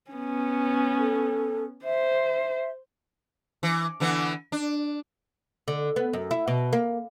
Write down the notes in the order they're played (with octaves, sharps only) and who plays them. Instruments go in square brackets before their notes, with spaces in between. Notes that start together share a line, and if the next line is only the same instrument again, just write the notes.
[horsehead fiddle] B3 C#4
[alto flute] A4
[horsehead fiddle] C5 [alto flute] E5
[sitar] E3
D3 E3 B3
D4
[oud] D3
B3
F#2
E4
B2
A#3